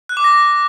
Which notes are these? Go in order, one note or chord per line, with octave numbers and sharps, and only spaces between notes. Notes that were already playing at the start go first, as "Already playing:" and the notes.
F#6
D6
A#6